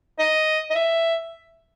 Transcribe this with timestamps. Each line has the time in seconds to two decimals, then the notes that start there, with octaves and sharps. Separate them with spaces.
0.19 D#5
0.71 D#5
0.75 E5